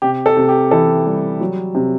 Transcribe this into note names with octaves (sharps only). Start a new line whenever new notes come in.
C3 G4
A4
C3
G4
E3 A4
G3
F#3
C3